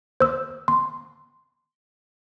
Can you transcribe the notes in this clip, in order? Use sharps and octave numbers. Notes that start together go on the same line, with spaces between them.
C5 E6
C6